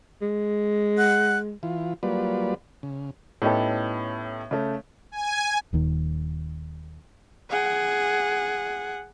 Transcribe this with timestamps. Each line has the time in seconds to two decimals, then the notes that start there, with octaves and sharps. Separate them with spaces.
0.22 G#3
0.98 F#5 F#6
1.63 E3 F4
2.03 F#3 G3 A#3 F4 B4 D5
2.83 C#3
3.42 A2 B3 C#4 D#4 G4 A4
4.51 C#3 A3
5.12 G#5
5.73 D#1 D#2 D#3
7.50 G#4 F#5